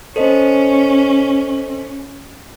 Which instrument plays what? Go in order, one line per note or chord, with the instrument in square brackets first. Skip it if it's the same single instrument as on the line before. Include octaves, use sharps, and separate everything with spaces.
[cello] C#4 [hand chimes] A4 C5 D#5